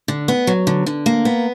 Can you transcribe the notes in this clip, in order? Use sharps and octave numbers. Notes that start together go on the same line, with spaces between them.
D3
B3
F#3
D3
D3
A#3
B3